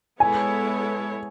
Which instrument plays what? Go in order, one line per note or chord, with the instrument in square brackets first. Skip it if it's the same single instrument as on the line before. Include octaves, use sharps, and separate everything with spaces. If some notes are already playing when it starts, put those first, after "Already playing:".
[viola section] G#3 B3 E4 A4 C#5 [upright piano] G#5